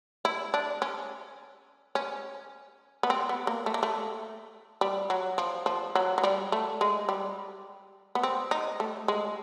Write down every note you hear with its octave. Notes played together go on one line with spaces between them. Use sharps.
E4
D4
C#4
C#4
B3
C4
B3
A#3
A3
A#3
A3
G3
F#3
F3
F3
F#3
F#3
G3
A3
G#3
G3
B3
C4
D#4
A3
G#3